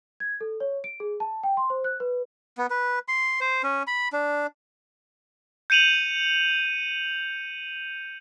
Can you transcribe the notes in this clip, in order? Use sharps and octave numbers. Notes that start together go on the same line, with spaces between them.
G#6
A4
C#5
D7
G#4
A5
G5
C6
C5
F#6
B4
B3
B4
C6
C5
C#4
B5
D4
G6 C#7 D#7 F7 F#7